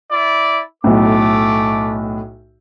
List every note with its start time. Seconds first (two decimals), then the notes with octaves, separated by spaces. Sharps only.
0.12 E4 D5
0.84 B1 A2 A3 D6